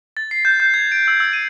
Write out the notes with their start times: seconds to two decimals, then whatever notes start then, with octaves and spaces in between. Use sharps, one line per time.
0.17 A6
0.31 C7
0.45 G6
0.60 G6
0.74 G#6
0.92 D7
1.08 E6
1.20 E6
1.33 D#7